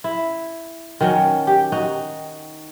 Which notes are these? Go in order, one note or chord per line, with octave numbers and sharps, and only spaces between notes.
E4
D#3 F#3 C#4
G4
D#4 F#4